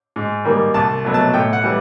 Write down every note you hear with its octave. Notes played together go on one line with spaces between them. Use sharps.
G#2
D#3 G3 A#3
C2 A5
B2 F#3 A3
A5
A2 G5
F#5
E3 G3